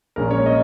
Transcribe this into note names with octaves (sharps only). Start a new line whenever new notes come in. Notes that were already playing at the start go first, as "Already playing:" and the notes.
A#1 A#2 G#3 C#4 A#4
C#5
D#5